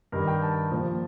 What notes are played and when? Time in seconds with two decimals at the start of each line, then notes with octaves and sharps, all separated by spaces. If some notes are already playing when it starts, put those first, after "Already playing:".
0.12 G2 D#3 G3 A#4
0.27 G5
0.42 A5
0.71 A#2 F3